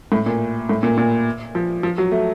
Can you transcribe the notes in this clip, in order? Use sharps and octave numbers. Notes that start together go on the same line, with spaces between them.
A2
A#2
A2
A#2
A#2
F3
F3
F#3
A3